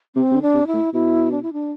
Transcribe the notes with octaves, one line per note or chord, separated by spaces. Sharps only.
C3 C4
C3
D3
D4
C3
E4
A2
B2 E4
D4
E4
D4